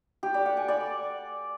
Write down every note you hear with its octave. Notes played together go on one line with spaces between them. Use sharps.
G4
D5
F#5
G#5
D5